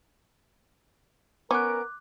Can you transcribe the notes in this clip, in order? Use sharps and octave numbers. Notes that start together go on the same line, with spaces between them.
B3 C#4 A#4 D6 F#6 D7